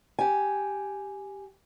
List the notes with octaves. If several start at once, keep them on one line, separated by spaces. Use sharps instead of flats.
G4 G#5